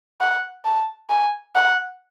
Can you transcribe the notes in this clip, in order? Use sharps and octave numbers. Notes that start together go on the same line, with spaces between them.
F#5
A5
G#5
F#5